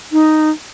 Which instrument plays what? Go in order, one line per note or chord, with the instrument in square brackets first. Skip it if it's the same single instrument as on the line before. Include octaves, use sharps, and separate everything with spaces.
[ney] D#4